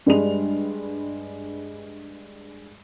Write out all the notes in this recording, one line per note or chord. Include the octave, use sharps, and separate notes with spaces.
G2 G3 G#3 F7